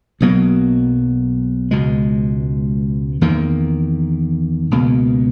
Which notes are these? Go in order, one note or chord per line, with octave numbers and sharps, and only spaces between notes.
B1 B2 F#3 A#3
C#2 B2 G#3
E2 D#3 A#3
C#2 B2 A#3